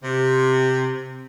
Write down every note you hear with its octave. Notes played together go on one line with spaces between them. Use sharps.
C3